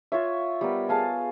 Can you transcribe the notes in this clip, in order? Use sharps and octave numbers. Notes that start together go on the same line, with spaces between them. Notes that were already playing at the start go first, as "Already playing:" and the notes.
F4 C#5 E5
G3 B3 A#4
G#4 F5 A5